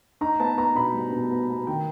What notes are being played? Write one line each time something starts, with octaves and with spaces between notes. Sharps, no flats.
D#4 A#5
B3 A5
B3 A#5
B2 B5
G3
B2
B3
B3
D#3 G5